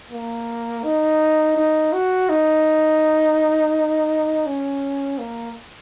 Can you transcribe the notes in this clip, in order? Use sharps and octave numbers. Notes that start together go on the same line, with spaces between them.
A#3
D#4
D#4
F#4
D#4
C#4
A#3